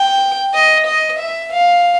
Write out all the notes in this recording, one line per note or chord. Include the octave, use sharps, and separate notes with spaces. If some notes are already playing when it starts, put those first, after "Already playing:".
Already playing: G5
D#5
D#5
E5
F5